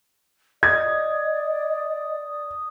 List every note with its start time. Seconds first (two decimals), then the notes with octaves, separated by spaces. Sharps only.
0.63 D5 D#5 D#6 G#6